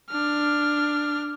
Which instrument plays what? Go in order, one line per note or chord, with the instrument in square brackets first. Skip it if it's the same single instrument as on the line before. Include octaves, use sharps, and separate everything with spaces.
[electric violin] D4 F6